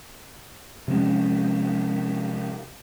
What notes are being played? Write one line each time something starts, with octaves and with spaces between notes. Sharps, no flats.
C3 F3 G#3 C#4